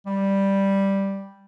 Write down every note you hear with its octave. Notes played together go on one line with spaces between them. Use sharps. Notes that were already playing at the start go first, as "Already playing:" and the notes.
G3